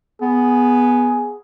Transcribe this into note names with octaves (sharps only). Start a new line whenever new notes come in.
B3 G#4